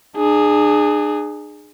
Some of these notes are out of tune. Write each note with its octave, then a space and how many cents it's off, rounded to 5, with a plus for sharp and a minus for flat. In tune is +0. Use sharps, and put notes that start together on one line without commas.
D4 +40 G#4 +0